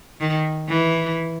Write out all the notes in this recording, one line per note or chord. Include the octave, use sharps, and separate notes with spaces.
D#3
E3